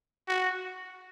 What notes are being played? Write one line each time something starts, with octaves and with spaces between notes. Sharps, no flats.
F#4